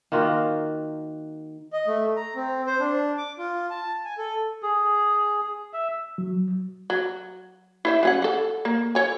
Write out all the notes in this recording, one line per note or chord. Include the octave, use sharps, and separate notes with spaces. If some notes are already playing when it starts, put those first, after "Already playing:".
D#3 A#3 F4 F#4
D#5
A3
A#5
C4
C5
D4
D6
F4
A5
G#5
A4
G#4
E5
F#3
F#3
E4 C5 E5
F#3 C#4 F#5
A4 F#5
A#3
A4 C#5 G#5